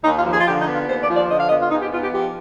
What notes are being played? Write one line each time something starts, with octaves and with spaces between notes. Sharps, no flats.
D#2 D#4
F4
F3
G#4
F4
D3 G4
D#4
B3
F4
D#2 C5
D5
F3
D5
D3 D#5
F5
B3 D#5
F4
G#2 D#4
G4
B3 F4
G4
F3 G4